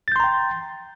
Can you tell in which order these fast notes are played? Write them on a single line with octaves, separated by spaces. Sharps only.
A6 G6 C6 A#5 G5